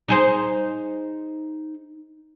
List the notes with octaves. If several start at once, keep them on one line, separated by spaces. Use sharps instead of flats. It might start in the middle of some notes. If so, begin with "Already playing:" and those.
D#4 G#4 C5